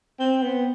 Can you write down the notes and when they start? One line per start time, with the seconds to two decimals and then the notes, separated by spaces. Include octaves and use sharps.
0.20 C4
0.43 B3